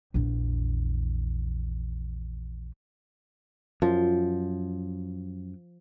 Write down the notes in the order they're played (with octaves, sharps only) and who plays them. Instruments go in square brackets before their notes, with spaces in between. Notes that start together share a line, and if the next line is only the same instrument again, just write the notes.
[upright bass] A#1 E2
[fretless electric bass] F#2 [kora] F3